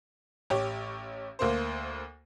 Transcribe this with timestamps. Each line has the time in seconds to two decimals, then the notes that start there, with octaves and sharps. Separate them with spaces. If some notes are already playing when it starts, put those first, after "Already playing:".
0.50 A1 G4 C#5
1.39 D2 A#3 C5